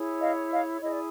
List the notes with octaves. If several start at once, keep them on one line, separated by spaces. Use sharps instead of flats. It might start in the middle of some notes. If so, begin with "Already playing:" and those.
Already playing: E4 G#4 C#5
D#5 F5
D#5 F5
E4 G#4 C#5 D#5
D5